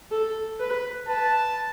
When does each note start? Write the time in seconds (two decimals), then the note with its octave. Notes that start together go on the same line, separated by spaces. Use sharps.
0.11 A4
0.60 B4
1.08 B4 A5